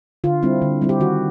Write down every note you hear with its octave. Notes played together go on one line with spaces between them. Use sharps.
D3 F4
G3 C4 E4
D3
G3 C4 E4
G4
D#3 F#4